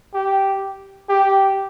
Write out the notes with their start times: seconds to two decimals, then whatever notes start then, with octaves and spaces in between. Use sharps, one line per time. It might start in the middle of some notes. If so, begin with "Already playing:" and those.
0.14 G4
1.09 G4